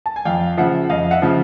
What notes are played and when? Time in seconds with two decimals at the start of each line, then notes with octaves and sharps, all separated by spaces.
0.06 A5
0.16 G#5
0.25 F2 F5 G5
0.57 C#3 F3 E5 F#5
0.90 F2 D#5 F5
1.11 E5 F#5
1.22 C#3 F3